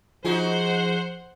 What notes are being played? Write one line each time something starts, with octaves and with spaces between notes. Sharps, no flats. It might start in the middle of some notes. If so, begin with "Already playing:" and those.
F3 D#4 F#4 G#4 C5 F#5